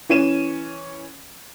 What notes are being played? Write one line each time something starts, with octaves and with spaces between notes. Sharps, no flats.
E3 C#4 D#7 E7